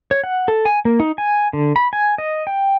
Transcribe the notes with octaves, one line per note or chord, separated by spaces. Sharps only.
C#5
F#5
A4
G#5
A#3
D#4
G#5
D3
B5
G#5
D#5
G5